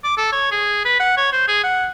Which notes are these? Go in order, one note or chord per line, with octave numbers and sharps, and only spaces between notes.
D6
A4
C#5
G#4
B4
F#5
C#5
C5
G#4
F#5